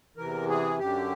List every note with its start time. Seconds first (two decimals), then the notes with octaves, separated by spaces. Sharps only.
0.17 E2 C3 E3 A#4
0.49 G#4
0.79 F#2 D3 G4